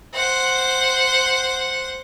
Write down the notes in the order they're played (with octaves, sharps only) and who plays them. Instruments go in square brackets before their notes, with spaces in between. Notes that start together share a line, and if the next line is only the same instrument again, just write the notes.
[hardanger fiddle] C5 F#5